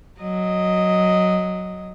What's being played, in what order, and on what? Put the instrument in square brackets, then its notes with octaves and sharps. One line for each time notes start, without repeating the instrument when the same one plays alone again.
[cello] F#3 D#5